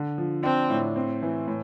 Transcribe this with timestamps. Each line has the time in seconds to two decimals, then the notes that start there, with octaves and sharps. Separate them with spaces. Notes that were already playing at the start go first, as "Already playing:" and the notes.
Already playing: D3
0.18 F3
0.43 C4 D4
0.70 A2
0.96 C4
1.22 E3
1.48 A2